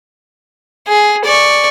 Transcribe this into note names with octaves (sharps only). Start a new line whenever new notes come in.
G#4
D5 C#6